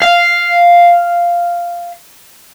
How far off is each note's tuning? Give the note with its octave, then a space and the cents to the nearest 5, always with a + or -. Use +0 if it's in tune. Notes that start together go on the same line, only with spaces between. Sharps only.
F5 -5